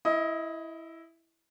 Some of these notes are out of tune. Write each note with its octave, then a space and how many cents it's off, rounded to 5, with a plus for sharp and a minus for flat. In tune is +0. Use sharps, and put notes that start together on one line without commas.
E4 +0 D#5 +25